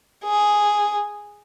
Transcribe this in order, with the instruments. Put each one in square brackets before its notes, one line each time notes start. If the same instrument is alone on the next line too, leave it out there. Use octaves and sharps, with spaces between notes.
[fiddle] G#4